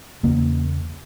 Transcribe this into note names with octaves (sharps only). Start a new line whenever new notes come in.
E2 C#3 A#3